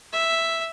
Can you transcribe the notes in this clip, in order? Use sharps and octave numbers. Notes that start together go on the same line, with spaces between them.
E5